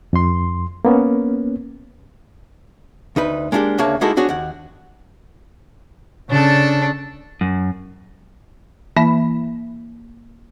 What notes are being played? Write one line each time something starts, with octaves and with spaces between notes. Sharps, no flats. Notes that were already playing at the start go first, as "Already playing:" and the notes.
F2 C6
A#3 B3 C#4
D2 D#4 B4
G#3 A#3 D4 F#4 G4
D2 C#3 A#3 D4 C#5 A5
G#3 A#3 D#4 E4 F#4 A4
D4 F#4 G#4 C#5
D#2 F#5
C#3 D4 A4
F#2
E3 A#3